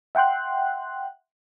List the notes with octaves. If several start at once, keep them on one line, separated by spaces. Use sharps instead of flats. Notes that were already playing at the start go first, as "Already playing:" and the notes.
E5 F#5 G5 C6 F#6